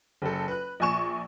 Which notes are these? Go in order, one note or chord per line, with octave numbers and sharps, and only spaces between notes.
F#1 A4
B4 F#6
A#1 A#2 G#5 C#6 E7